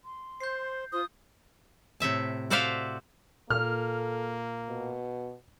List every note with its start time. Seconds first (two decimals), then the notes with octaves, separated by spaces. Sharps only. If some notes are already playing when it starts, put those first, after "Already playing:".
0.04 C6
0.40 C5 G6 C7
0.92 F4 C5 D#6
2.00 A2 C3 E5 A5
2.50 F#4 A4 C5 D5 E5 F5
3.50 A#2 A#3 A4 F6
4.69 B2